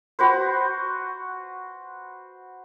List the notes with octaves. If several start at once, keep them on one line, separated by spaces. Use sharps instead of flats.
F#4 B4 C5